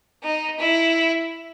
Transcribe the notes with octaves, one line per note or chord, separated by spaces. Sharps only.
D#4
E4